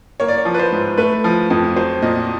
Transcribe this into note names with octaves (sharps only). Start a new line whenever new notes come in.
A#3 C#5
D5
C#5
F3
B4
C5
G#2
A3 B4
F3
F2
F#3 C5
A#2 D#5